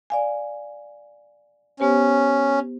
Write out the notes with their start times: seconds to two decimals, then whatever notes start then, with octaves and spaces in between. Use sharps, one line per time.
0.10 D5 F5 G#5
1.80 B3 C#4 G4 C5